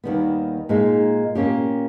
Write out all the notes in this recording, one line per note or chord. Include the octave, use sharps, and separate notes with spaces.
D#2 D#3 G3 B3
A#2 G#3 D#4
A#2 A#3 C#4 G4